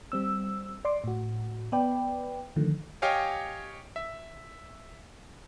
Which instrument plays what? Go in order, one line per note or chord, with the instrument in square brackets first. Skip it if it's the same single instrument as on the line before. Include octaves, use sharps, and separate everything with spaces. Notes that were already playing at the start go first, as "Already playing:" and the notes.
[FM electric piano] G3 C4 E6
D5 C6 D6
A2 F#4
B3 B4 D5 G5
D3 D#3 F3 A3
[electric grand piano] G4 C#5 D#5 F5 G5 G#5
E5